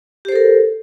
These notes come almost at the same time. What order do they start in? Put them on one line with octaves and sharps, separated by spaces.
G4 C5 A4 A#4